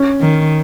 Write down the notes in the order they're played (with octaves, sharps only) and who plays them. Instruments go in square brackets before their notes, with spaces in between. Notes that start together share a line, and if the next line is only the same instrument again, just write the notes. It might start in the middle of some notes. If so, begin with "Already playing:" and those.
Already playing: [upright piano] C#4
[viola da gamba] D#3